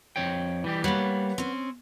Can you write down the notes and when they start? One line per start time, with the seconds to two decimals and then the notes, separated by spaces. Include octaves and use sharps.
0.16 F2 C#5 G5
0.64 E3 G3 G4
0.84 G3 A#3 B4 C#5 F#5
1.38 C4 C#4